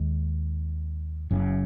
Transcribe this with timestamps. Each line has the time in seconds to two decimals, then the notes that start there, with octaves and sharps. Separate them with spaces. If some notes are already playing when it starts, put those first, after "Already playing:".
Already playing: D#2 D#3 G#3
1.31 F#1 F#2 C#3